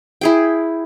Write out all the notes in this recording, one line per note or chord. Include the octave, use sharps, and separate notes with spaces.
E4 G#4 G5